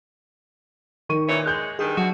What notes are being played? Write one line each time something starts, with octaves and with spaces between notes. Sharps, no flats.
D#3 C#6 D#7
A#2 E3 C#4
G#3 F#6 G6
G2 D#3 G#4
D3 F#3 A3 F#4